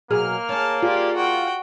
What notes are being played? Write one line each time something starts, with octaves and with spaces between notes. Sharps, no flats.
B2 F#3 A#3 G#4 F6
G#4 C#5 A5
F4 G4 G#4 D5
F#4 G5